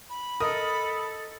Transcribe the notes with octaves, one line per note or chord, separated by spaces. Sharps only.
B5
A4 A#4 D#5 D#6